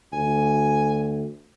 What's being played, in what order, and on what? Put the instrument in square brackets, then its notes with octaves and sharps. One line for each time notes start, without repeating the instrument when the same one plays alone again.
[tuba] D2 [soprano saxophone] G#5